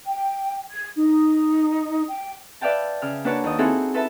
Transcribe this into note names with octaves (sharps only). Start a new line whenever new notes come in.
G5
G#6
D#4
G5
B4 D5 E5 F5 G5 A5
C#3 F6
A#3 D4 F#4 B4 C#5 A5
D#2 D#5
C4 D#4 E4 F#4 G#4 A4
A4 B4 E5 A5